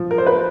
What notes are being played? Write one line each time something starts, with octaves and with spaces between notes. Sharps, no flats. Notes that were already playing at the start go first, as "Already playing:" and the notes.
Already playing: F3
A#4
C5
B4